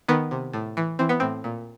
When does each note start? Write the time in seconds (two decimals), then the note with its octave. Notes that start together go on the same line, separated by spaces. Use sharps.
0.08 D#3 B3
0.31 C3
0.53 A2
0.77 E3
0.99 E3 C4
1.09 B3
1.20 A2 C4
1.44 A#2